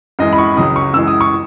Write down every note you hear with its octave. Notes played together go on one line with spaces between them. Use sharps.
F#2 E3 G#3 D#5
B5
C#6
C#2 C#3 F#3 D#6
C#6
F#2 E3 G#3 E6
D#6
C#6